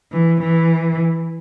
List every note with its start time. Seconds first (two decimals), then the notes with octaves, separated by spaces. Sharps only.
0.12 E3
0.42 E3